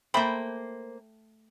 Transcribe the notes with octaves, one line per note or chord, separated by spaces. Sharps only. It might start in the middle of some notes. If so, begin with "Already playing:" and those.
A3 A#3 C5 G5 B5